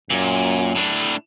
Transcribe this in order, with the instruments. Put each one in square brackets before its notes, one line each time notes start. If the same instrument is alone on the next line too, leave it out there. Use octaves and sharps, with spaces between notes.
[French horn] F#2 [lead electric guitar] A#2
[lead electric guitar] A2 D4